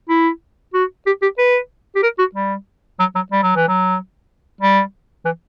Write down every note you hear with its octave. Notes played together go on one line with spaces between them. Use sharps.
E4
F#4
G4
G4
B4
G4
A#4
F#4
G3
F#3
F#3
G3
F#3
E3
F#3
G3
E3